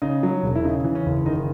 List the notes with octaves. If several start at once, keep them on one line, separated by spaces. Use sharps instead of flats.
C#3 D#4
F#3
E1
E4
C#3 D#4
E3
C#4
F#1
D#3 D#4